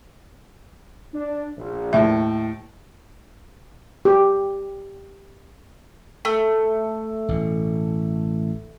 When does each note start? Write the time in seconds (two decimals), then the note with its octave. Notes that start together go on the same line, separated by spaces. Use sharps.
1.14 D4
1.58 A#1
1.93 D#2 A2 E5
4.05 G4
6.25 A3
7.29 A1 B2